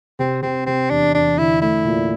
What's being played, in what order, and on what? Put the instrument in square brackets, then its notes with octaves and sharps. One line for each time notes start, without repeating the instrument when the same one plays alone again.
[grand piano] C3 [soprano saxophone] C4
[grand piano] C3 [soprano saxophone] C4
[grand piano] C3 [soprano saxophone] C4
[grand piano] E2 [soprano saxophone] D4
[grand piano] E2 [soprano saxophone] D4
[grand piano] D3 [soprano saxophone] E4
[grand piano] A3 [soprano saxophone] E4
[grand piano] A#2